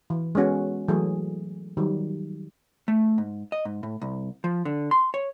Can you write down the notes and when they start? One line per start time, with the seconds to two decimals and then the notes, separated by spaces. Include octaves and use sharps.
0.10 E3
0.35 G#3 B3 C#4 F#4 A4
0.88 E3 F#3 A3 G#4
1.77 D#3 F#3 G3
2.88 A3
3.18 G#2
3.52 D#5
3.65 G#2
3.83 A2
4.02 C2
4.44 F3
4.65 D3
4.91 C6
5.14 C#5